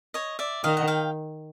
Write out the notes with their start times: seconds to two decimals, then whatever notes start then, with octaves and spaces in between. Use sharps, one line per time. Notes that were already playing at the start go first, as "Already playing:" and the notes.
0.14 C#5 D#5
0.39 D5 E5
0.64 D#3 D#5 F5
0.77 F#5
0.87 F5 G5